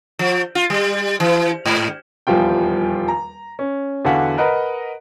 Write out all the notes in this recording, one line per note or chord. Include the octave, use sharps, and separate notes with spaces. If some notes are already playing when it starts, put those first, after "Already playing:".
F3
F4
G3
E3
G#2
D#1 E2 F3 G3 F4 G5
A#5
C#4
E2 D3 F#4 F5 F#5 B6
A#4 B4 D#5 F#5 A#5